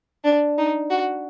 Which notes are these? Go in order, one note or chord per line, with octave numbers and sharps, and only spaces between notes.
D4
D#4
F#4